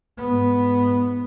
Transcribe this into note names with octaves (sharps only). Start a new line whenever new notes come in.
G#2 B3